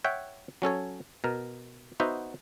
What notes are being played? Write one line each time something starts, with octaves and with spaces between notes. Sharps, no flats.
C#5 E5 F#5 G5
F#3 C#4 A4 C#5
B2 A#4
B3 D#4 F#4 C5 E5